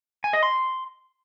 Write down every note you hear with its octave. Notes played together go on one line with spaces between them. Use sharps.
G#5
D#5
C6